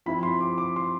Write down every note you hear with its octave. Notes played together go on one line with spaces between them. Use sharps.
F3 C4 E4 B5
B5
C6
D6
D6
C6